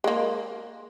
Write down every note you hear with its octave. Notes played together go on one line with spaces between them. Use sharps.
G#3 A#3